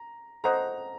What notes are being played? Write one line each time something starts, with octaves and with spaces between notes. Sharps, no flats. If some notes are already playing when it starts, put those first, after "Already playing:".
Already playing: A#5
A4 C5 D#5 F#5 A#5